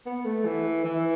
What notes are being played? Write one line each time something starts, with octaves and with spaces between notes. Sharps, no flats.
B3
A3
E3
E3